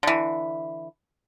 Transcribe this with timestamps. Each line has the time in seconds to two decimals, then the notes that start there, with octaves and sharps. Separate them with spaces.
0.03 D3 E3